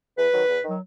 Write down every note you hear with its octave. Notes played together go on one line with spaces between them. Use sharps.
E2 B4
D#3 F#3
E2
D#3 F#3